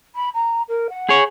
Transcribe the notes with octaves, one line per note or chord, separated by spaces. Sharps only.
B5
A#5
A#4
F#5
G#4 C#5